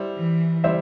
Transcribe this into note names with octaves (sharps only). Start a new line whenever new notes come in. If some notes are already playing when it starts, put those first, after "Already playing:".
Already playing: G3 E4 C5
E3
G3 E4 C5 E5